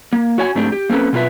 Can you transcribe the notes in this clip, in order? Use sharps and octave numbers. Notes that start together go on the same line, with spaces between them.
A#3
F#4 C#5 G#5
G#2 A3 C4 D4 G4
G4
A#3 C4 C#4 A4 B4
B2 A3 F4 B4 E5